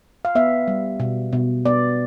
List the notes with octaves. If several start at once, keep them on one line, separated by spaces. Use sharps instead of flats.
F5
B3 E5
G3
B2
B2
B3 D5